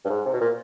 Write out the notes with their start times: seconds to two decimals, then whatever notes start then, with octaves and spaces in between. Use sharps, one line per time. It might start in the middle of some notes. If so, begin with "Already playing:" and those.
0.05 G2
0.09 G#2
0.26 C3
0.33 B2
0.41 A#2